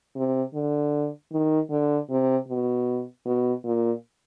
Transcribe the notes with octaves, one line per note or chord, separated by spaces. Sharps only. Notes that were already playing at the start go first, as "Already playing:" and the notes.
C3
D3
D#3
D3
C3
B2
B2
A#2